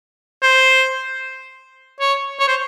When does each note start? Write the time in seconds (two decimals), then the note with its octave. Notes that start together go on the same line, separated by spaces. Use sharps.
0.42 C5
2.01 C#5
2.40 C#5
2.47 C5